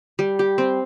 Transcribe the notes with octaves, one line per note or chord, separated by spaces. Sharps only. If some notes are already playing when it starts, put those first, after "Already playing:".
G3
G4
C4